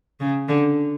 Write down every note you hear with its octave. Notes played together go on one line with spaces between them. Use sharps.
C#3
D3